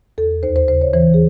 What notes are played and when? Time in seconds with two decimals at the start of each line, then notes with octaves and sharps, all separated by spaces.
0.18 E2 A4
0.43 D#2 C5
0.56 C5
0.68 C#3 C5
0.81 C#5
0.93 E3 C5
1.14 G#4